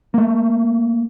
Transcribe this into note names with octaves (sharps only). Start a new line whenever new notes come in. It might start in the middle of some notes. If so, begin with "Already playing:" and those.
A3 A#3